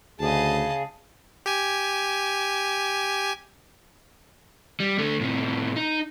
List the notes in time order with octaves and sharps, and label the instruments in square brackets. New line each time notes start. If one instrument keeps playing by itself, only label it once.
[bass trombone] D2 [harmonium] C#3 G#4 [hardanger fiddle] D#5 A5
[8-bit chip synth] G4 G#5
[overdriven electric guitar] G3
D3 A3
A2 C3
D#4